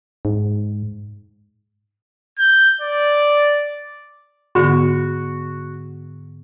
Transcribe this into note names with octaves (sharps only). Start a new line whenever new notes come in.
G#2
G6
D5
G#2 D3 B3 F#4